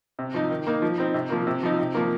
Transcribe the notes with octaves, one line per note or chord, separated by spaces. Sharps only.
C3
F3 D#4
D#3
A#3 D#4
F3
C4 D#4
C3
F3 A#3
C3
F3 D#4
C3
F3 A#3